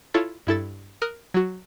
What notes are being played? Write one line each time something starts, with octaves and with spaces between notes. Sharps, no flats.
E4 F4 A4 C#5 A5
G2 E4 A4 A6
A#4 D#6 F6 F#6
F#3 F#4